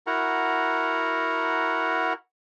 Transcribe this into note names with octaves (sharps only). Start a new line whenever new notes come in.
E4 F#4 A#4 F#5 A#5